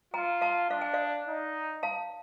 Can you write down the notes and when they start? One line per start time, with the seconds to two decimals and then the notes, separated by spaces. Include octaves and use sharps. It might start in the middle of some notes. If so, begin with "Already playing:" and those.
0.14 F4 G5 A#5
0.42 F5 A5
0.70 D4 F5
0.81 G5
0.93 D5 F5
1.27 D#4
1.83 F5 A5